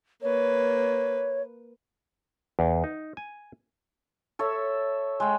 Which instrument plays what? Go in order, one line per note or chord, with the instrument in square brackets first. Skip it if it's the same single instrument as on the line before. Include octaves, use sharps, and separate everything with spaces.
[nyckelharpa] A#3 B4 [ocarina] C#5
[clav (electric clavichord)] E2
D#4
G#5
[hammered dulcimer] A4 C#5 E5
G#3 G5